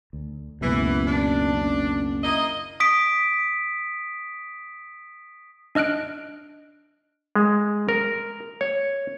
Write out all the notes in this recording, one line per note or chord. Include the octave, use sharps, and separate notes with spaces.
D2
F#1 C#2 F#2 B2 E3
D4
F#1
A#3 E4 D#5
D#6 B6 D7
D4 D#5 F6 F#6 D7
G#3
A#4
C#5